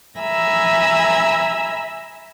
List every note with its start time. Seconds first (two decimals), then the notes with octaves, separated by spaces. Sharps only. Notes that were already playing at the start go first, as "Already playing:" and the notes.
0.19 E5 G#5 A#5 B5 E6